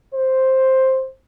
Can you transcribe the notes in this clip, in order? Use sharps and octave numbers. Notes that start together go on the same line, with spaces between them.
C5